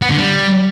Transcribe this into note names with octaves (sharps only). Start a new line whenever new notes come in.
B3
D3
G3